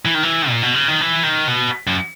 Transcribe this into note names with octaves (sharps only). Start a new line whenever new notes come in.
E3
D#3
E3
A#2
B2
C#3
D#3
E3
D#3
B2
F#2